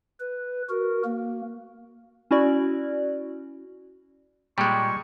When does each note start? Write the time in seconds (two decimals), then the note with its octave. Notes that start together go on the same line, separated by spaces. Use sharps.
0.20 B4
0.69 F#4 A#4
1.05 A#3
2.31 C#4 E4 F#4 D5
4.58 A#2 G3 G#3 A#3 G5 C#6